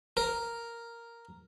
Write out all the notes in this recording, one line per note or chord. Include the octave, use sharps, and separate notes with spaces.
A#4